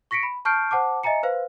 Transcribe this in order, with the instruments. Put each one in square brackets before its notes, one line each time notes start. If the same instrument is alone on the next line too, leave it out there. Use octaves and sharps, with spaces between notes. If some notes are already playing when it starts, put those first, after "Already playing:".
[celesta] C#6 A#6 B6 C#7 D7
B5
A5 C#6 F6 G6 C7 D7
C5 F#5 A5 D6
D#5 E5 G#5 A#5 C#7
B4 C5 F5